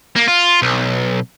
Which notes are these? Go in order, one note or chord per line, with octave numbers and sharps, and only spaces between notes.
A#3
F4
B1